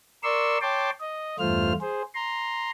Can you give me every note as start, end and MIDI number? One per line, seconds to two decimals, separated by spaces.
0.23 0.58 70
0.23 0.58 74
0.23 0.58 84
0.23 0.58 85
0.23 0.58 88
0.62 0.90 73
0.62 0.90 79
0.62 0.90 81
0.62 0.90 84
0.62 0.90 86
1.00 1.36 75
1.39 1.73 40
1.39 1.73 43
1.39 1.73 57
1.39 1.73 65
1.39 1.73 72
1.39 1.73 89
1.81 2.02 68
1.81 2.02 72
2.15 2.71 82
2.15 2.71 84